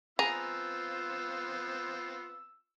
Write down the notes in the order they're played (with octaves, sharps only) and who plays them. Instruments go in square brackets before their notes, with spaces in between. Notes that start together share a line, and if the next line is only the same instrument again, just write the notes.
[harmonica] B3 C4 F4 [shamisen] G#4 [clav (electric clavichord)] A#5 [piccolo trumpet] E6